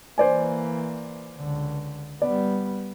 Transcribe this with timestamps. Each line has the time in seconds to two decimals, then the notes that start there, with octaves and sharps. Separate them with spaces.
0.18 E3 A#3 C5 D5 G#5
1.38 C#2 D3
2.22 G3 B3 D5